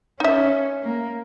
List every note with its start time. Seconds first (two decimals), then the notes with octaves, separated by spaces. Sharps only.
0.20 C#4 D#4 E5
0.83 A#3